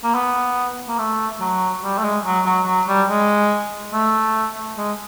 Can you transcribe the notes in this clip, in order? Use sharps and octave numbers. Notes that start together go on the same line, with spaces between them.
A#3
B3
A#3
A3
F#3
G3
A3
G#3
F#3
F#3
F#3
G3
G#3
A3
G#3